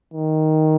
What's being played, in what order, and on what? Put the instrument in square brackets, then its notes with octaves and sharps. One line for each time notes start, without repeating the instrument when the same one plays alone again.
[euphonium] D#3